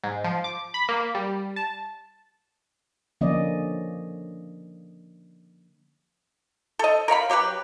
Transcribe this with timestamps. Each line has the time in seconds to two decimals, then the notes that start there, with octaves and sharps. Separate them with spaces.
0.03 G#2
0.24 F3
0.44 D6
0.74 B5
0.89 A#3
1.15 G3
1.56 A5
3.21 D3 F3 A#3 C#4 D5 D#5
6.79 A4 D#5
7.08 A#4 C#5 F5 B5
7.30 F#3 G4 A#4 B4